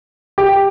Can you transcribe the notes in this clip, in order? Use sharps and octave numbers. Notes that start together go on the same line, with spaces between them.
G4